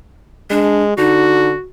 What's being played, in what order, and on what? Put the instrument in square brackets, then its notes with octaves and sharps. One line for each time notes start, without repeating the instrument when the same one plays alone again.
[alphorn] G#3 [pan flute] D4
[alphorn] D3 [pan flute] D#4 [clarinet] F#4